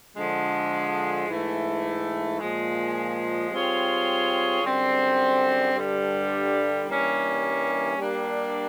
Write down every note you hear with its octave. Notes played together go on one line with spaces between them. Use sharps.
D3 F3 G#3
G#2 E3 A3
A#2 F3 G#3
G3 C4 F4 G#4 C#5
F#2 D3 G3 C4
G2 D3 G3
G2 E3 G3 A#3 C#4
G3 A#3 D4